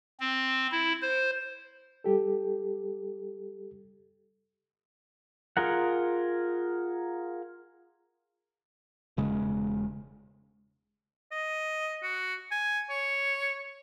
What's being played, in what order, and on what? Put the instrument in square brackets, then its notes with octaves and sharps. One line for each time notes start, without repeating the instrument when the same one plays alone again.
[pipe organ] C4
E4
C5
[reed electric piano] G3 G4 A4
[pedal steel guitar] F4 G#4 A#4 F#5
[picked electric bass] E1 C#3 G#3
[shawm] D#5
F#4
G#5
C#5